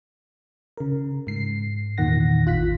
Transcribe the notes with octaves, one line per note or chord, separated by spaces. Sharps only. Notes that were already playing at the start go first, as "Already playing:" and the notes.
C#3 A#4
G#2 C7
E2 A#2 D#3 F#5 A#6
A1 F4 F#6 B6